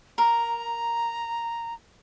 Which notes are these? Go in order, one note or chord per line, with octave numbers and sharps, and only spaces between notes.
A#4 A#5